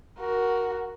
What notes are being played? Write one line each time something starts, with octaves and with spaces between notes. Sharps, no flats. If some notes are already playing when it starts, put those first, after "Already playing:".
F#4 A#4